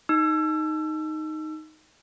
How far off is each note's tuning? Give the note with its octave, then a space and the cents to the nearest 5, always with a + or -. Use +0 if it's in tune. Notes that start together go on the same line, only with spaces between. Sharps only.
D#4 +0 E6 +30